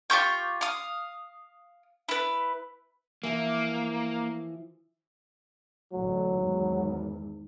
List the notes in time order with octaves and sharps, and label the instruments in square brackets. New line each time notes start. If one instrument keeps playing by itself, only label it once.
[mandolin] F4 G4 C#6 G6
F5 D#6
E4 B4
[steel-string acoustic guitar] E3 F3 [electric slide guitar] A#3
[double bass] A1 D2 [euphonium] F#3
[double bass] G#1 E2